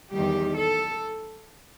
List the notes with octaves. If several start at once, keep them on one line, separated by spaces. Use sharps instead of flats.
E2 D#3 G3 G4
A4